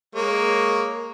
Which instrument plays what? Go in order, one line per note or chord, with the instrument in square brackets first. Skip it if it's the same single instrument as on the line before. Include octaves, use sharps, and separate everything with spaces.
[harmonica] G#3 A#3 C#5